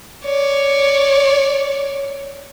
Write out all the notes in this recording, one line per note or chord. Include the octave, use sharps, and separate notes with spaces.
C#5 D5